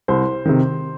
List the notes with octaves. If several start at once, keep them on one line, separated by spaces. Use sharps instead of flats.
C2 C5
C3 D#3